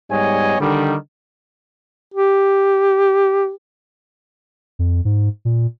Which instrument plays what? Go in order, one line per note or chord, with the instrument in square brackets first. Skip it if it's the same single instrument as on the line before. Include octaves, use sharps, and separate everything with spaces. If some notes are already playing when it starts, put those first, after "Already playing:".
[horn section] G#2 G3 B3 C#5 D#5 G#5
D3 D#3 G3
[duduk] G4
[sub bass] F2
G#2
A#2